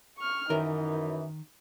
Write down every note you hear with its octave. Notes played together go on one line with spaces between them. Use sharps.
C#6 F6
F#2 D#3 E3 D#4 A#4